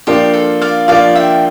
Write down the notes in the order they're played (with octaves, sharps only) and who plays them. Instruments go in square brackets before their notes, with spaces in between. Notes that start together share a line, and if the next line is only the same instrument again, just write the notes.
[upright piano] F3 A#3 D4 F4 [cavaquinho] G4
[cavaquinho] A4
D5 F5
[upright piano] F3 A#3 D4 F4 [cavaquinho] D5 F5
[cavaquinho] E5 G5